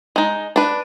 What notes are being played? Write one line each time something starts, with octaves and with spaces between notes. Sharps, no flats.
G#3 D#4
D4 B4